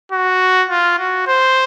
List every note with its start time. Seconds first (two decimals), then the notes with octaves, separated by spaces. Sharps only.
0.12 F#4
0.70 F4
0.99 F#4
1.27 C5